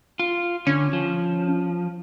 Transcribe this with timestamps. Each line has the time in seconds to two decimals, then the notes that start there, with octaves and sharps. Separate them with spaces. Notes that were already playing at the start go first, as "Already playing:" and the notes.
0.19 F4
0.66 D3 C#4
0.93 F3